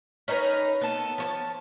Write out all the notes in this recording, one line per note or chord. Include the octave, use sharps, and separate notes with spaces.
C#4 D#4 A#4 B4
B3 A4
F3 C#5 A5